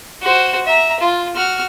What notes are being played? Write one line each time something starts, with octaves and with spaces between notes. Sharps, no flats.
F#4 C5
E5 A#5
F4
F#4 F6